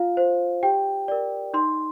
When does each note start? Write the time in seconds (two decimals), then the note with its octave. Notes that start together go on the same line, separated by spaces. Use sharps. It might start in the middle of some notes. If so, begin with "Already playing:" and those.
Already playing: F4 F5
0.17 C5
0.63 G4 G5
1.08 A#4 D5
1.54 D#4 C6